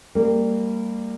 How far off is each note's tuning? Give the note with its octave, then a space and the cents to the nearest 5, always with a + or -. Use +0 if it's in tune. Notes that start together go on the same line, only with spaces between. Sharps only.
G3 +10 A#3 -30